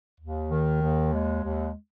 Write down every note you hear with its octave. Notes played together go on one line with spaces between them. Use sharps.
D#2
D#3
D#2
G#3
D#2